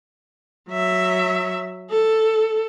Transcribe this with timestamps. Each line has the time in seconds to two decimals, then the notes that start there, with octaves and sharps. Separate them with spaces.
0.69 F#3 E5
1.90 A4